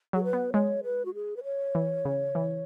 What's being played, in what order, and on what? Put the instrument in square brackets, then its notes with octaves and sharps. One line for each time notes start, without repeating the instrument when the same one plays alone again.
[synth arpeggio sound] F#3 [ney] G#4
[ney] B4
[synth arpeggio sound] B3
[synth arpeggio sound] G#3 [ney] C#5
[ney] B4
F#4
G#4
B4
C#5
[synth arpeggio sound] E3
C#3
E3